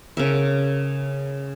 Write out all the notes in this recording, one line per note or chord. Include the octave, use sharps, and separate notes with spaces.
C#3 A#4 E5